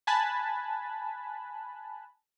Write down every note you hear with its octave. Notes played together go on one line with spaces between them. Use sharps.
G#5 A5 B5 F#6